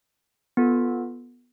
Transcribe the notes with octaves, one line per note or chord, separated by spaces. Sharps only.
B3 F4 A4